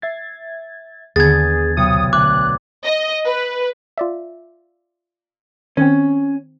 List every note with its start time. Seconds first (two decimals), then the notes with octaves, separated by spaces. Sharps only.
0.02 E5 G#6 A6 C7
1.16 D#2 D3 B3 G#4 G#6 A6
1.77 B1 C3 D#6 C#7
2.13 D2 D6 F#6
2.85 D#5
3.26 B4
3.98 F4 D5 E5
5.77 D#3 C4 C#4